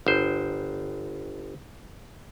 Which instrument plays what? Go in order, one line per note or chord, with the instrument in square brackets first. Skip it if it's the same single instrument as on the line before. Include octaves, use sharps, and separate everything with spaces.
[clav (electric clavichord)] G1 C5